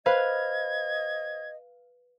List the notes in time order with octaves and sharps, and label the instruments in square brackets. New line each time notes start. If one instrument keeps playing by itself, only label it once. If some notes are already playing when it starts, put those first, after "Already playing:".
[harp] B4 F5 [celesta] C5 [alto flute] D#5 [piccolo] G#6